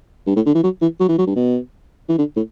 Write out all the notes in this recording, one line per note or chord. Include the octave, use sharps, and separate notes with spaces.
G2
A2
D3
E3
F#3
E3
F#3
E3
F#3
G2
B2
E3
D3
A2